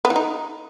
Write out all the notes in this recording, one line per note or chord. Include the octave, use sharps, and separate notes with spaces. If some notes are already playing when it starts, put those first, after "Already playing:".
B3
E3
D#4